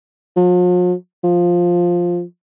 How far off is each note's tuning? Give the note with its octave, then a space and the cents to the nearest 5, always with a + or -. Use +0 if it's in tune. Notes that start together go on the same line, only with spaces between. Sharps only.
F3 +45
F3 +5